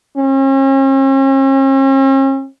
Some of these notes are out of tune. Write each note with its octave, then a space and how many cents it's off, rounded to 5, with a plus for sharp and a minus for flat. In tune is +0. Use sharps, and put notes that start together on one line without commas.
C#4 -45